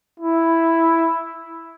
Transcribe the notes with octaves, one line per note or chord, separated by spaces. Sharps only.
E4